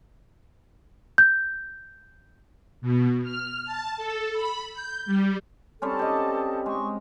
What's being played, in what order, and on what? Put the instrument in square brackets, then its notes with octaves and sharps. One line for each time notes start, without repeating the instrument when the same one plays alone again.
[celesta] G6
[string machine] B2
F6
A5
A4
B5
G6
G3
[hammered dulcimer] G3 C4 C#4 [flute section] A4 A5
[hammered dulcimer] G4 D#5
[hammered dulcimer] G#3 [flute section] C#6